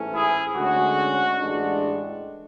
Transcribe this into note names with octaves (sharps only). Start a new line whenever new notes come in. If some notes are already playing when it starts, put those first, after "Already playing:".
Already playing: A1 G#2 E3 A3 C#4
E4 G#4
D2 D3 G#3 C#4 F#4
A1 A2 G#3 D4